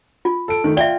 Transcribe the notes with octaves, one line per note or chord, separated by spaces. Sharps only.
F4
A4 D7
D#3 A3
F4 D5 E5 G5 G7